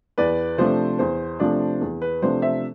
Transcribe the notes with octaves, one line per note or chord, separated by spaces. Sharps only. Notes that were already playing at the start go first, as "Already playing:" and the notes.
E2 B4 D5
C3 F3 A3 D4 C5
E2 C5
C3 F3 A3 D4
E2
B4
C3 F3 A3 D4 C5
C5 E5